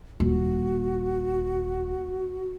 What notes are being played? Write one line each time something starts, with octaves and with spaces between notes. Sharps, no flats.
D#1 F#4